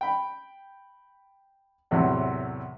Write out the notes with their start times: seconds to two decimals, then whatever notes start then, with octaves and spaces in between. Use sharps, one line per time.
0.01 G5 B5
1.91 E2 A2 C3 F#3